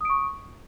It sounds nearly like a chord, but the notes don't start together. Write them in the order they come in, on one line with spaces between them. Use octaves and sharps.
D#6 D7 C#6